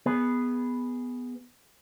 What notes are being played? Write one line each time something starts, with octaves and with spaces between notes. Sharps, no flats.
B3 G#4 B4